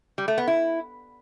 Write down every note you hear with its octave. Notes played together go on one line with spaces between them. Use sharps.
G3
A3
B3
E4